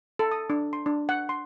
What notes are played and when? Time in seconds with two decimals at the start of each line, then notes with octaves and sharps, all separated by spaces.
0.19 A4
0.32 D#6
0.50 D4
0.73 C6
0.86 D4
1.09 F#5
1.29 C6